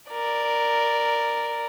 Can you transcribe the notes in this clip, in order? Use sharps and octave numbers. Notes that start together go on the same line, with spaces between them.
A#4 D5